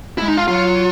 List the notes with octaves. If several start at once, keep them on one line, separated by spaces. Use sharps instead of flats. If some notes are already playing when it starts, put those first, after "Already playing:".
G#3 E4
D#4
F4
F#3 F4